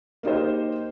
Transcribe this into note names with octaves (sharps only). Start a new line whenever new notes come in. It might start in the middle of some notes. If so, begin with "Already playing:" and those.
A#3 D#4 G4 C5